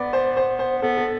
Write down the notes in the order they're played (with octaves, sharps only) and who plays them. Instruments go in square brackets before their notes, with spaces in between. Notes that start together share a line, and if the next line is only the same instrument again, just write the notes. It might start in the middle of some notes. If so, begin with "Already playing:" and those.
Already playing: [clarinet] B3 [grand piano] B4 D5
[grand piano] C5
C5
C5
[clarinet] B3 [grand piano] A4
[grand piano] A4